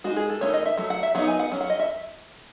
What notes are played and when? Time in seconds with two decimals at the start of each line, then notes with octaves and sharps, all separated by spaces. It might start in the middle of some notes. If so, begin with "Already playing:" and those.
0.04 G#3 D#4 F#4
0.16 G#4
0.29 A4
0.41 D#3 A3 D#4 C#5
0.53 D#5
0.66 E5
0.77 F#3 A3
0.90 F#5
1.03 E5
1.15 F#3 B3 D#4 F#5
1.27 G#5
1.39 F#5
1.52 F#3 C#4
1.61 F#5
1.70 D#5
1.79 E5